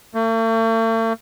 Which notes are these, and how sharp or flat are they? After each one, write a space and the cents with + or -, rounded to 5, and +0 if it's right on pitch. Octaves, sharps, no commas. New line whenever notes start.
A3 +45